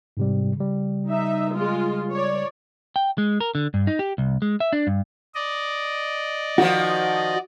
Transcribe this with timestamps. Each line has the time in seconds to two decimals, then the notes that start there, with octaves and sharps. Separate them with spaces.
0.17 G#2 C3 G3
0.57 C#3 G3
1.09 D#4 E5
1.54 G#3 F4
2.11 C#5 D5
2.96 G5
3.18 G#3
3.41 A#4
3.55 D3
3.74 G2
3.87 D#4
3.99 G4
4.18 C2
4.42 G#3
4.60 E5
4.73 D4
4.87 G2
5.35 D5 D#5
6.58 D#3 F3 F#4